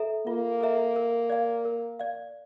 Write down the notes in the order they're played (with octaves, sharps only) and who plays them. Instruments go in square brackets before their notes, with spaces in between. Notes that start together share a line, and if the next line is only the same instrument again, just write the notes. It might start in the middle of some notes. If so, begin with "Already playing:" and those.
Already playing: [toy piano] A4 E5 A#5
[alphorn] A#3 [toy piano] F4
[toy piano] A4 E5 A#5
A#4
D5 F5
A#4
D5 F5